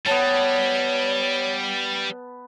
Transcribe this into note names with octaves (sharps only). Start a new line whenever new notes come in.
G3 B3 C#5 A5